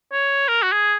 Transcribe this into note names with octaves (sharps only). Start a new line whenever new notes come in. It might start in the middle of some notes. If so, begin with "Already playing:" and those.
C#5
A#4
F#4
G#4